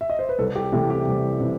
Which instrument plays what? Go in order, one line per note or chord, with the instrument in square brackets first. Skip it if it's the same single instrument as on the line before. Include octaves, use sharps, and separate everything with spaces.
[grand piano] E5
D#5
C5
B4
C2 A4
G4
C3 E3 A3 G4
G4
C2
C3 E3